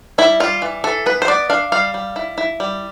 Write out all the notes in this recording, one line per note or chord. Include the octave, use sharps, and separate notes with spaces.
G3 E4
G3 F4
E3
E3 A4
B3 B4
C5
B3 D5
D4 F5
G3 F5
G3
E4
E4
G3